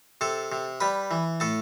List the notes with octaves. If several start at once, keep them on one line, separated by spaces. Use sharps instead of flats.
C3 A4 A5
C3
G3 B4 B5
E3
A2 A4 A5